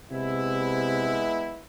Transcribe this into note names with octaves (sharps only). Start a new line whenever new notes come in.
C3 G#3 B3 E4